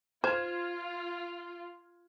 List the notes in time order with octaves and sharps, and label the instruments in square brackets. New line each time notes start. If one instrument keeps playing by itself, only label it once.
[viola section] F4 [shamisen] C5 [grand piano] F6 G#6 E7